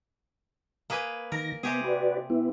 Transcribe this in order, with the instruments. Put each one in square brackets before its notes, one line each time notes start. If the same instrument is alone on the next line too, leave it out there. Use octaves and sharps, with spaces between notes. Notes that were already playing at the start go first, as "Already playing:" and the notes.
[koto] A#3 G#4 B4
[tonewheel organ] D#3 A#6 [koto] A#4
[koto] C3 G4 G#4 [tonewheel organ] B3
[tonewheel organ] F#4 B4 D5
B3 E4